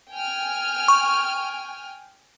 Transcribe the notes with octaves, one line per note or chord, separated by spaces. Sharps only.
G5 G#5 F6
C#6